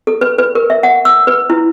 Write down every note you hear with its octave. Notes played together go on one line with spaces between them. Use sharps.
A4
B4
B4
A#4
E5
F#5
E6
B4
E4